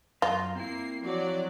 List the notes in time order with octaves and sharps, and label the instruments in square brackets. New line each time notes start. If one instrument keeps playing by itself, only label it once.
[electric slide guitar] F#2 A#5 [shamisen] F4
[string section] A#3 C7 [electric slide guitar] C4 E4
[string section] F3 F#3 D5